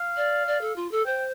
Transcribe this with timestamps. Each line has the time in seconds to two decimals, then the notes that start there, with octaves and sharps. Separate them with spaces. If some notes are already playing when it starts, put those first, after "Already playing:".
Already playing: F5
0.16 D5
0.47 D5
0.61 A4
0.76 F4
0.91 A4
1.06 C5 G5